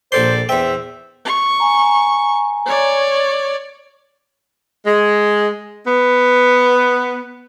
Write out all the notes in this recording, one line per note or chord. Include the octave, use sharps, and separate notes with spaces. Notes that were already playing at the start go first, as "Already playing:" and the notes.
A#1 A4 C5 D5 C6
E2 C5 E5 G5
C#6
G#5 A#5
C#5 D5
G#3
B3